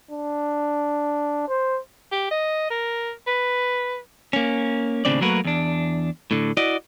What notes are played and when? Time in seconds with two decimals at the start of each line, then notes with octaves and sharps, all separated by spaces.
0.11 D4
1.49 C5
2.12 G4
2.31 D#5
2.70 A#4
3.27 B4
4.33 A#3 C#4
5.05 D#2 A2 C#3 C4 D4 D5
5.21 F#3 A3 A#3 F#4 A#4 B4
5.44 E2 D4
6.31 A2 D3
6.57 E4 F#4 D5 D#5